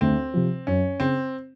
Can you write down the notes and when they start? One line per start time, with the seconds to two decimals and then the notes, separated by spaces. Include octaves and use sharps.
0.01 D2 C4
0.34 C3 F3
0.67 F#2 C#4
1.00 C#3 C4